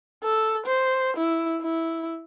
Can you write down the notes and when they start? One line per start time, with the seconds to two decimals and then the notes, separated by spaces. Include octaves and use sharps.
0.24 A4
0.66 C5
1.17 E4
1.62 E4